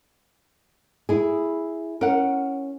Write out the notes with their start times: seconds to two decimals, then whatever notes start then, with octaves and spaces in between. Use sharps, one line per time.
1.09 E4 G#4
2.01 C#4 A#4 F#5